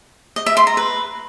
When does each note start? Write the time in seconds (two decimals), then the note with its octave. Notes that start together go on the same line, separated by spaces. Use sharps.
0.36 D#5
0.46 E5
0.57 C6
0.67 A#5
0.77 B4